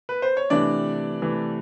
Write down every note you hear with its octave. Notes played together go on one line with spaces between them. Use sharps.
B4
C5
C#5
C3 E3 A3 D4 D5
C3 E3 A3